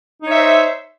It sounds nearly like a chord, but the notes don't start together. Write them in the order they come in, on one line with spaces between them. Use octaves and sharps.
D#4 C#5 E5 C5